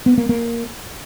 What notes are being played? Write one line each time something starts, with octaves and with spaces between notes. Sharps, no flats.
B3
A#3
A#3